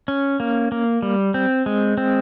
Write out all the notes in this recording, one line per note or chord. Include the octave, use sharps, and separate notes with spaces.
C#4
A#3
A#3
G3
C4
G#3
C4